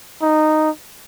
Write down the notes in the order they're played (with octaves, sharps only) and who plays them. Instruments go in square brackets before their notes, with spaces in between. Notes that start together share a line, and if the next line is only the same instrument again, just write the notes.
[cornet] D#4